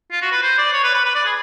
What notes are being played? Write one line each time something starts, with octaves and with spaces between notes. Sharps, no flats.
F4
F#4
B4
C5
D5
C#5
B4
B4
B4
D5
G#4